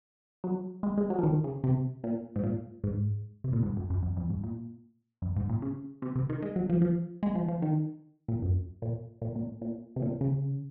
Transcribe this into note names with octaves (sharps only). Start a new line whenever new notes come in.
F#3
G#3
G#3
F#3
F3
D#3
C#3
C3
A#2
G#2
A#2
G#2
C3
A#2
G#2
F#2
F#2
F#2
F2
G#2
A#2
F#2
G#2
A#2
C#3
C3
C3
D#3
G#3
F#3
F3
F3
G#3
F3
F3
D#3
A#2
F#2
A#2
A#2
A#2
A#2
C3
A#2
C#3